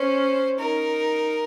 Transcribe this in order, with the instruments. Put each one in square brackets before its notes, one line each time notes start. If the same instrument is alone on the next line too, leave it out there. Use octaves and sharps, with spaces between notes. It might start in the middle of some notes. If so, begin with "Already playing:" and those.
Already playing: [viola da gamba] C#4 [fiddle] C5
[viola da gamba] D#4 [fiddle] A#4